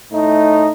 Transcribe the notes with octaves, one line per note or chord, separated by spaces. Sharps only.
A2 A3 D#4